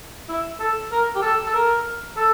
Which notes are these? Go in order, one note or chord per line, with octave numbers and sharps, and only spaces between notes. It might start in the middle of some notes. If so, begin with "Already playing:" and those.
E4
A4
A#4
G4
A4
A4
A#4
A4